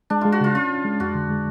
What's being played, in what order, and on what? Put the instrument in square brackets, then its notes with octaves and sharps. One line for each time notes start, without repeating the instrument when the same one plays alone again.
[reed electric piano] G#3 [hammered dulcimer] D4
[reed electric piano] G#3 [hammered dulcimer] F4
[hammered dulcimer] F#4
[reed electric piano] C#3 [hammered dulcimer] F4
[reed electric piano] C#4 [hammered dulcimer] F4
[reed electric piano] C#4
G#3
[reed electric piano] F2 [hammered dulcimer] F#4
[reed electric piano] D3
G#3